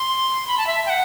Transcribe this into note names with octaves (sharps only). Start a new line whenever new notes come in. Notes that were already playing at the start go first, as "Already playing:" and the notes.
Already playing: C6
B5
A5
E5
G5
F#5